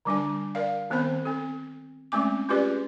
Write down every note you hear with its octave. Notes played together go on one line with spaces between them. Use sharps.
D3 G3 D4 G#5
A#4 D5 F5
D#3 B3 C4 C5 B5
C4 A4
G#3 A3 C4 C#4 D6
C#4 F4 G4 G#4 B4 D5